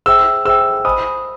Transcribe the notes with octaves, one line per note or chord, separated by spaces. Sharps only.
G#4 C5 E5 G5 E6
G#4 C5 E5 G5 E6
C5 D#5 G#5 B5 D#6